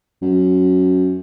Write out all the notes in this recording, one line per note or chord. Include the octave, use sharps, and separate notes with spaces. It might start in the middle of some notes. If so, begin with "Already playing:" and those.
F#2